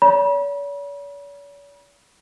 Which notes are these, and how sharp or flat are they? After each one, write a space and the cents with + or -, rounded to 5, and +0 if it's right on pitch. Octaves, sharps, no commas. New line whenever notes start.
C#5 +45 B5 -40